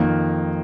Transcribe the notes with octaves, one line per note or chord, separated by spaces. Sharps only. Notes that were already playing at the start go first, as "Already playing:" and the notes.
Already playing: F2 D#3 A#3